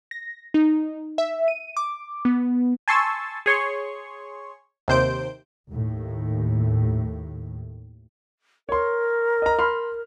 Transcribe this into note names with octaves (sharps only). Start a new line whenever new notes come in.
A#6
D#4
E5
D#7
D6
B3
G#5 A5 C6 C#6 E6 A6
G#4 C#5 C6 C#6
D#2 C3 C5 G6 D7
D#2 A2
A#4 C#5 C6
D#5 A#5
B5 C6 F6